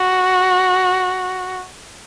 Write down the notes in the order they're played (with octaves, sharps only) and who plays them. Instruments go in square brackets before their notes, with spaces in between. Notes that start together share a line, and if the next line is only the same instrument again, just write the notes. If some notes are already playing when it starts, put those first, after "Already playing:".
Already playing: [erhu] F#4